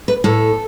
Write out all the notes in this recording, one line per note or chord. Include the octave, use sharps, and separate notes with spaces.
B4
A2 A4